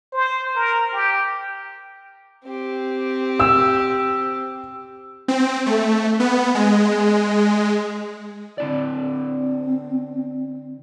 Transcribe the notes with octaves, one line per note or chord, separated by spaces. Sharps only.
C5
A#4
G4
C4 G4
E6
C4
A3
B3
G#3
D3 C4 E4 D5